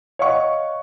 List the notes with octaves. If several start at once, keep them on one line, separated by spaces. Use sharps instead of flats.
C#5 D#5 F5 F#5 C#6